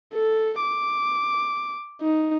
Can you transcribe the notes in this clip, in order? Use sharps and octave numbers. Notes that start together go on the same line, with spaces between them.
A4
D6
D#4